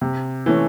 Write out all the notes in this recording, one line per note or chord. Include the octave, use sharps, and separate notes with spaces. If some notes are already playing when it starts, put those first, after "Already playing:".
C3
E3 A3 C#4